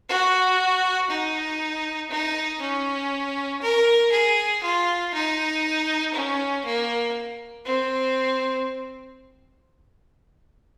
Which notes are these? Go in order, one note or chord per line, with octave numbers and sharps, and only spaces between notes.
F#4
D#4
D#4
C#4
A#4
G#4
F4
D#4
C#4
A#3
C4